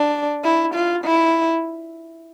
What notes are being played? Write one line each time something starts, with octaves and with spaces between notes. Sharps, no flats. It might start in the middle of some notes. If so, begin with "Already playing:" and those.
Already playing: D4
E4
F4
E4